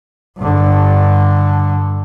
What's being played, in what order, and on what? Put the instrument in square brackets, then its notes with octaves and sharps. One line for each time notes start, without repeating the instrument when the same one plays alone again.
[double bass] G2 D3